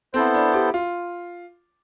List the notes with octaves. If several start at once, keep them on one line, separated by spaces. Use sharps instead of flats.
B3 C4 E4 A4 C5
D4
G4
F4